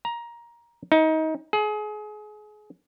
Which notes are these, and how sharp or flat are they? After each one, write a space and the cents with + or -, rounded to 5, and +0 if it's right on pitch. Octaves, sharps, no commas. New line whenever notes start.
A#5 +15
D#4 +25
G#4 +30